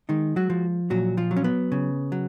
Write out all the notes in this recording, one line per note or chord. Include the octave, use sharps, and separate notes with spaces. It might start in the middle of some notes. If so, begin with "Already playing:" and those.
D#3 G#3 D#4
F#3 F#4
F3
A#2 F#3 F#4
F3 F4
F#3
C#4
B3
C#3
F#3